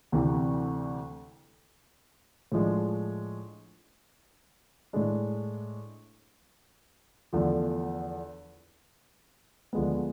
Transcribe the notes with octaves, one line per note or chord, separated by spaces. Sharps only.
D2 C3 E3
A2 F3 G#3 D4
A2 G#3 D4
E2 D3 F3 A3
D2 D3 F3 G#3 B3